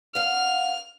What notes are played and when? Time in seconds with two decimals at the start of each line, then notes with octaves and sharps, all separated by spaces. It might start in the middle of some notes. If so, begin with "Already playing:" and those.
0.15 F5 F#5 F6